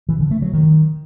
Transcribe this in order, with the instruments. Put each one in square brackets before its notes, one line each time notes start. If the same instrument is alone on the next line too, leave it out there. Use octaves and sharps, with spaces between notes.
[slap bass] E3
D3
A3
F#3
D#3